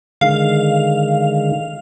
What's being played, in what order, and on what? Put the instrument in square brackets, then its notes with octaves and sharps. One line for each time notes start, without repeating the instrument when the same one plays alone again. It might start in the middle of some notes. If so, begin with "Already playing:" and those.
[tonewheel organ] D3 D#3 G#3 [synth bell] F5